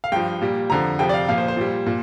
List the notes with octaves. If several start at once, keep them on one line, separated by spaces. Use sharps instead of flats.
F5
G2 F3 G5
A#2 G3
F2 D3 F3 A#5
F2 C3 F3 G5
D5
F5
A#2 F3 F5
C5
C5
A#2 G3
A#2